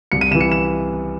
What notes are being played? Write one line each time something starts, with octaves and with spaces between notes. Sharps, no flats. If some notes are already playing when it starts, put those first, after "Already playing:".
C2 C#7
D#7
C3 E3 E7
C#7
E7